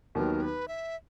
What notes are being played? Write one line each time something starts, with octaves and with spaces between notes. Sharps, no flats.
D#2 D#3 F#3 B3 A#4
B4
E5